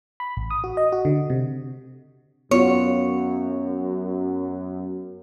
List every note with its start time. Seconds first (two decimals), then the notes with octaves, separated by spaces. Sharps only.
0.20 B5
0.37 A1
0.50 D#6
0.64 F#4
0.77 D#5
0.92 F#4
1.05 D3
1.30 C3
2.51 F#2 B3 F4 F#4 C#5